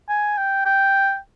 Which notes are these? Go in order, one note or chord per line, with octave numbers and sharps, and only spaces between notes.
G#5
G5
G5